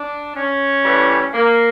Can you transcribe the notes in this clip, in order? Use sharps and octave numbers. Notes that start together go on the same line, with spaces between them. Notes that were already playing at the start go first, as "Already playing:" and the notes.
Already playing: D4
C#4
A2 E3 G3
A#3